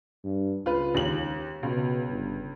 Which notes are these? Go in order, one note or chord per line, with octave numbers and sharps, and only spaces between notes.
G2
C#2 F4 B4
D#2 F#7
C#2 B2
G1